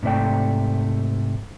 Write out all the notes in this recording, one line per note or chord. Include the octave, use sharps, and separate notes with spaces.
G#2 C3 A3 D5 G5